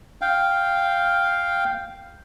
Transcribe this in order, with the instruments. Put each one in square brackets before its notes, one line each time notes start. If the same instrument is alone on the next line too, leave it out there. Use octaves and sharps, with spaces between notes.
[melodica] F5 G5